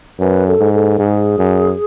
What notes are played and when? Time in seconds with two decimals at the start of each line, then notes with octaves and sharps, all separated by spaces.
0.19 F#2 B4
0.46 A4
0.60 G#2
0.73 A4
0.99 G#2 G#4
1.39 F#2